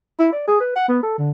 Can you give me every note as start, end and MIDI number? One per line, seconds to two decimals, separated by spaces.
0.19 0.31 64
0.32 0.44 74
0.47 0.59 68
0.60 0.73 71
0.75 0.84 78
0.88 1.02 59
1.03 1.17 69
1.18 1.31 50